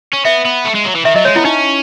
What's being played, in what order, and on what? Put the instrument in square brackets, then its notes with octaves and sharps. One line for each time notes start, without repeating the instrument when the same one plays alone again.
[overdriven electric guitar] C#4
[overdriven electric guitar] B3 [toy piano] E5
[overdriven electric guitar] B3
A3
G#3
F#3
E3
[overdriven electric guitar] D#3 [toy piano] E5
[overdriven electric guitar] F#3 [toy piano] D#5
[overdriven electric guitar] G#3 [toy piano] C#5
[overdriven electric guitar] B3 [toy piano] E4
[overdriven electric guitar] C#4 [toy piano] D#4